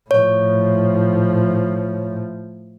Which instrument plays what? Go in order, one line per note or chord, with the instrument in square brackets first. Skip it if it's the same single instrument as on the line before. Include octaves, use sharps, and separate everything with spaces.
[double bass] A2 F3 [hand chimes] C#5